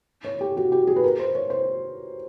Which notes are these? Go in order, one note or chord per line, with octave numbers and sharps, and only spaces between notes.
C#5
G4
F#4
G4
G#4
B4
A#4
C5
C#5
C5